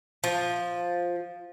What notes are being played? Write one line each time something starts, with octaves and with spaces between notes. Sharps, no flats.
F3